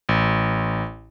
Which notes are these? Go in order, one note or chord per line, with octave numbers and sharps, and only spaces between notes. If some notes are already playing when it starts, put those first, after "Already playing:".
A1